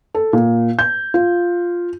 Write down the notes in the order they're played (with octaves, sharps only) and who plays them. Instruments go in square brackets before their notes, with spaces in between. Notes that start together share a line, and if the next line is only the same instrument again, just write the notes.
[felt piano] A4
A#2
G6
F4